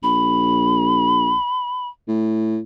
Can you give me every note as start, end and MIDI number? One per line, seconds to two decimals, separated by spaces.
0.03 1.34 34
0.03 1.88 83
2.08 2.59 45